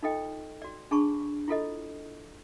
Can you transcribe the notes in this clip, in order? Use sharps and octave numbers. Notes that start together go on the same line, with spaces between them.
D#4 F4 A4 D#5 G5
F#4 D5
D4 G#4 A5 B5 C#6
E4 F4 A4 D#5